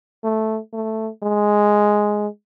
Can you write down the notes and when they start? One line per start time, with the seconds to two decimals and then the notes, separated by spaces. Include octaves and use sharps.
0.24 A3
0.73 A3
1.23 G#3